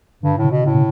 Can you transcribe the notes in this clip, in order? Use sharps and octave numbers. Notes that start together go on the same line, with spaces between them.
G2 D3
A2
C#3
B2
A2 C#3
B2